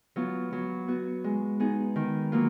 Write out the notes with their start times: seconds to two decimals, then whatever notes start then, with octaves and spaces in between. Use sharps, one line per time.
0.16 F#3 B3 F4
0.53 F#3
0.88 B3 F#4
1.24 G#3
1.60 B3 D#4 G#4
1.96 D#3
2.32 F#3 A#3 F4